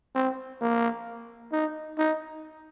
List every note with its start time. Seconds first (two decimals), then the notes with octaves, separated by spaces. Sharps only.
0.15 C4
0.61 A#3
1.52 D#4
1.98 D#4